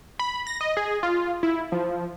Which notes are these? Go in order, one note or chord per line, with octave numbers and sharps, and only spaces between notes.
B5
A#6
D#5
G#4
F4
E4
F3